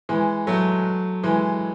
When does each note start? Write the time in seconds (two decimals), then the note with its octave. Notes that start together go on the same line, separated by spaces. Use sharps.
0.09 E3 G#3
0.47 F#3 A3
1.23 E3 G#3